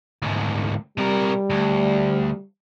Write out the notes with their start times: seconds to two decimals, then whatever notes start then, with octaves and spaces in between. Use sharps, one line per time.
0.22 D2 G#2
0.98 C3 G3 A#4
1.51 D2